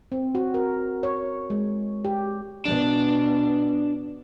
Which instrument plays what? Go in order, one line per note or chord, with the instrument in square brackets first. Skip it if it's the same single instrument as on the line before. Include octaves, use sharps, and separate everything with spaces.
[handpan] C4
F#4
A#4
C#5
G#3
G4
[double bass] B2 [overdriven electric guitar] D4